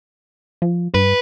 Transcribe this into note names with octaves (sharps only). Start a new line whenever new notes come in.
F3
G2 B4